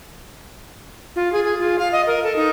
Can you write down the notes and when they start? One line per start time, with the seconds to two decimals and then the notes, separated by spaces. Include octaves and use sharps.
1.16 F4
1.33 G#4
1.44 G#4
1.59 F4
1.79 F5
1.92 D#5
2.07 A#4
2.23 A4
2.36 D#4